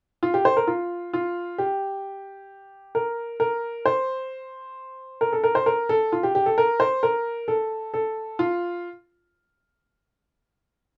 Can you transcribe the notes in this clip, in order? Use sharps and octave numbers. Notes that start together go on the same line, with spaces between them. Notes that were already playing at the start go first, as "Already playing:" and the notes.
F4
G4
C5
A#4
F4
F4
G4
A#4
A#4
C5
A#4
A4
A#4
C5
A#4
A4
F4
G4
G4
A4
A#4
C5
A#4
A4
A4
F4